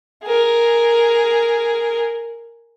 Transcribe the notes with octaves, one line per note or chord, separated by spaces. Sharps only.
G#4 A#4